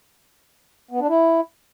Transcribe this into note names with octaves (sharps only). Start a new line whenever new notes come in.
B3
D4
E4